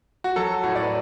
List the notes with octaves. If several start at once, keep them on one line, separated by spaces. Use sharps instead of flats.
F#4
F#3 A4
A2 F#4
D5
B4